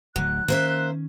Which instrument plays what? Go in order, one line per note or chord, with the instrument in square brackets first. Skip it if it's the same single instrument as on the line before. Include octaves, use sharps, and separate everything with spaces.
[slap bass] D1 D2 [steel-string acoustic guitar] F#3 [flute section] F#6
[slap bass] D#3 C#4 [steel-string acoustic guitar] A#3 C5 E5